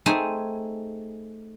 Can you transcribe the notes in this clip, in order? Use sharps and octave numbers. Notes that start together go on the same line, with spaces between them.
A3 C4 D#4 G#4 G#5